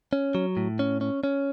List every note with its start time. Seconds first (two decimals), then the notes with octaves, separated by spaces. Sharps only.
0.13 C#4
0.35 F#3
0.57 A2
0.79 C#4
1.01 C#4
1.24 C#4